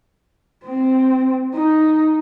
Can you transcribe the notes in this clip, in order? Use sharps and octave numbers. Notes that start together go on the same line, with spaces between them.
C4
D#4